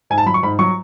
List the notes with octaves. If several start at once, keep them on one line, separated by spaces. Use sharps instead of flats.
G#2 G#5
A5
F#3 B5
C#6
G#2 B5
F#3 C#6